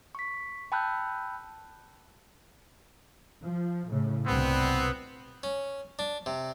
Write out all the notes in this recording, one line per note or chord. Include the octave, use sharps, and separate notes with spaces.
C#6 B6
G5 A5 B5 E6 F#6 G6
F3
A2 C#3
C2 G2 B2 B3 C4
C#4
D4
C3